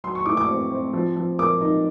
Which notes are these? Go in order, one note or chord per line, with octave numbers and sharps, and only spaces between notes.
F#3 C6
C#6
A2 D6
D6
C4
C4
F3
F3
A#3 D6
D#4